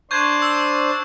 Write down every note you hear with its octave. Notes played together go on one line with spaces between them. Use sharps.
D4 C5 C#6 G6 G#6
E6